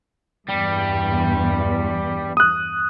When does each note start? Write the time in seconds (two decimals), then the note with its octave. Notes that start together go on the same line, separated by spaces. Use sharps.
0.49 E2 G2 G3
2.37 D#6 F#6